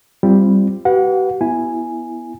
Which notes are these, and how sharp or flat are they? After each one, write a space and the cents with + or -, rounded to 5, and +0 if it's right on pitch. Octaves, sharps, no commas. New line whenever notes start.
G3 +0 C4 +0 F4 -35
G4 -45 B4 +0 F#5 -30
B3 +0 E4 +0 G#5 +0